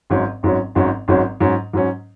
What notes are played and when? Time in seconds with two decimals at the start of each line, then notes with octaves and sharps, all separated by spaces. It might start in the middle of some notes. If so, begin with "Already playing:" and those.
0.10 G#1 G#2 F#3 C#4
0.43 G#1 G#2 F#3 C#4
0.75 G#1 G#2 F#3 C#4
1.08 G#1 G#2 F#3 C#4
1.40 G#2 F#3 C#4
1.73 G#2 F#3 C#4